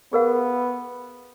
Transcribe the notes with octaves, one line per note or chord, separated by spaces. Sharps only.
B3 G#4 A#4 F5